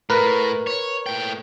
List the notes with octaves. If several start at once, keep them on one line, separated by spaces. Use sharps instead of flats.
A2 A#4 B4
C#5
A2 G5